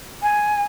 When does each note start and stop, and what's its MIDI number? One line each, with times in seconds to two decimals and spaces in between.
0.22 0.64 80